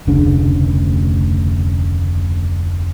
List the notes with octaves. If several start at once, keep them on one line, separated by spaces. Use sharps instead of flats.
F1 D2 C#3 D4